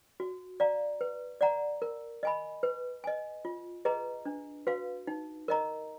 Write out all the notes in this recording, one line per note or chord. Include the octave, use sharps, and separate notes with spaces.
F#4
D5 F5 A#5
B4
D5 F#5 A#5
A#4
D#5 G#5 B5
B4
D#5 G#5
F4
G#4 B4 D#5 A#5
D4
F#4 B4 F5
D#4
A#4 D#5 A#5